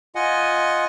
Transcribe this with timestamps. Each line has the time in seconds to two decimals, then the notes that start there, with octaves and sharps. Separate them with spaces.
0.15 F4 D#5 F#5 G#5